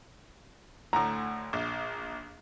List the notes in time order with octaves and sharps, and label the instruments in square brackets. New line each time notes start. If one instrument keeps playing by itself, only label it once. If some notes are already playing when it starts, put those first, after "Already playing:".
[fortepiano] D2 A2 [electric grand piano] A#5
[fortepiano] A#1